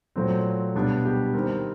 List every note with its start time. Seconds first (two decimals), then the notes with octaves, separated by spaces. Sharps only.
0.16 A#2 F#3 A3 C4
0.75 B2 G3 B3 D4
1.05 G4
1.34 D#3 G3 C4 A#4